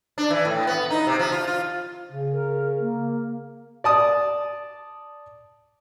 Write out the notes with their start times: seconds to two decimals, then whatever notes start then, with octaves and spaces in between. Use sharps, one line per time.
0.18 D4
0.31 E3
0.45 A2
0.67 B3
0.90 D#4
1.07 C3
1.19 F3
1.32 F4
1.47 F4
2.12 C#3
2.33 A#4
2.80 A#3
3.84 D5 A5 D#6